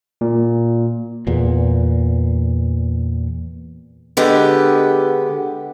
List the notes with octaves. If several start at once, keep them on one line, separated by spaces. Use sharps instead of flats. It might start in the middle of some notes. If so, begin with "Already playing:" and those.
A#2
E2 A#2
D3 G#3 B3 G4 B4